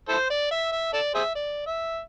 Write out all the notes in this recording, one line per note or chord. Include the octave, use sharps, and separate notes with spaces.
E4 A4 C5
D5
E5
E5
A4 D5
G#4 C5 E5
D5
E5